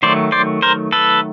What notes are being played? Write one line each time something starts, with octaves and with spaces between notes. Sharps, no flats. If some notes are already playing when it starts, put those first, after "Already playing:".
D#3 F#3 A3 C5 D5
C5 D5
A#4 C5
A4 B4